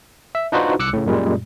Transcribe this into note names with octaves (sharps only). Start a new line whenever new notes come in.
E5
D4 D#4 F4 F#4 B4 C5
C2 D6 E6 F#6 C#7
A2 C#3
F#2 A#2 G3 G#3